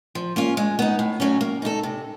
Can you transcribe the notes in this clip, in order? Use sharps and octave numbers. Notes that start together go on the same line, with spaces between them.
F3
A#3 C#4 F4
G#3
B3 D#4
A2
F#3 A3 C#4
A#3
D#4 F#4 A4
C3